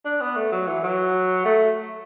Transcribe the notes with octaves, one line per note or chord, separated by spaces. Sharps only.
D4
B3
A3
F#3
E3
F#3
A3